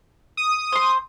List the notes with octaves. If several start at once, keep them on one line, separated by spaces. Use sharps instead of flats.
D#6
C5 C6